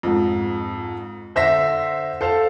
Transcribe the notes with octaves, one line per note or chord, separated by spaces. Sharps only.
F2 G#2
D3 C5 E5 A#6 B6
A4 C5 F5